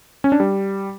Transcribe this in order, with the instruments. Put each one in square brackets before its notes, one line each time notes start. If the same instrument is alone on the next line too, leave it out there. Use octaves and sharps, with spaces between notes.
[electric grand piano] C#4
D4
G3